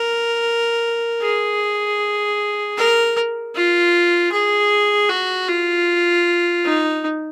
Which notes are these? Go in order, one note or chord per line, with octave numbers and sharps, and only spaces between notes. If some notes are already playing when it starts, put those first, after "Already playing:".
Already playing: A#4
G#4
A#4
F4
G#4
F#4
F4
D#4